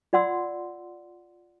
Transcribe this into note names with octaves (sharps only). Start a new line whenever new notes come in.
F4 D5 F#5 C6 E6